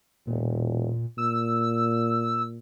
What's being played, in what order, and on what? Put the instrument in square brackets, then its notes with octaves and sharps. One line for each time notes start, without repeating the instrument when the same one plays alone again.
[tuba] E1 [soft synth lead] A#2
[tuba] A#2 [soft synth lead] E6